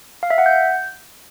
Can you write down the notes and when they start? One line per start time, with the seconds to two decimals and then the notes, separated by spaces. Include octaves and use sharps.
0.23 F5
0.30 E5
0.38 F#5
0.46 G6